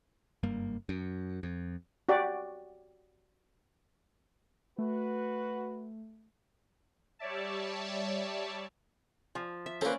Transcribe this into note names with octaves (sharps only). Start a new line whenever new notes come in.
F#1 G2 G3 A#3
F#2
F2
F#4 G4 D5
A3 F#4 B4
G3 C#5 D5 E5 A5
F3
E5
A#3 C4 C#4 A4 B4 D5